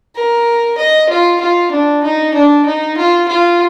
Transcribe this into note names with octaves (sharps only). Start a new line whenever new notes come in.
A#4
D#5
F4
F4
D4
D#4
D4
D#4
F4
F4